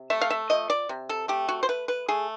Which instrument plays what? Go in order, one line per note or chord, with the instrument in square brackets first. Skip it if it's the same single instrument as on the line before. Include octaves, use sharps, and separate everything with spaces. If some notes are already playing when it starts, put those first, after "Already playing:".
Already playing: [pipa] C3
A3 E5
F5
E5
F3 D#5
D5
C3
A4
A3 G4
F#4
C5
A3 B4
B4
A3 G#4